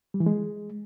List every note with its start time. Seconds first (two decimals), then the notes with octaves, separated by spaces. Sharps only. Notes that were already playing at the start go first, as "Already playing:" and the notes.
0.14 G3
0.20 E3
0.26 G#3